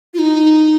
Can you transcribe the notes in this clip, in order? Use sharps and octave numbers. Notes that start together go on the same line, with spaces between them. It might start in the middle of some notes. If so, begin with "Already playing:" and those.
F4
D#4